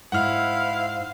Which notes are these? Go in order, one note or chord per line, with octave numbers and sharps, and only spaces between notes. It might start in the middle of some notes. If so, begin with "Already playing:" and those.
G#2 E4 C5 F5 F#5 F6